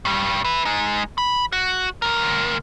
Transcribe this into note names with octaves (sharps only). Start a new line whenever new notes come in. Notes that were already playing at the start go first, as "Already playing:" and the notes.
G2 G3
E4 B4
G#3 D#4
B5
F#4
D2 A#4